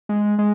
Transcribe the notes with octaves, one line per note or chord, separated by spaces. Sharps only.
G#3
G#3